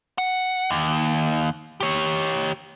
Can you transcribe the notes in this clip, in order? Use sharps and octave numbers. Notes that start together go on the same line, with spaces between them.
F#5
D#2
G4 C#5